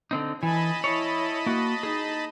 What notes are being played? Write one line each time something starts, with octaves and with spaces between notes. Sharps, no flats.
D3 C4 D#4
E3 D#5 G#5 A5 B5
E4 C#5
A#3 F#4
D#4 G#4